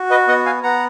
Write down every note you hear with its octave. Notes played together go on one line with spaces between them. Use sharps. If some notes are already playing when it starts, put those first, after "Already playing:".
Already playing: F#4
B4 D#5
B3 D#5 F#5
F5 G#5
B3 F#5 A#5